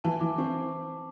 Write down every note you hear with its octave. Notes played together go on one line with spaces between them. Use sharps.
E3 A5
E3 D6
C4 C#6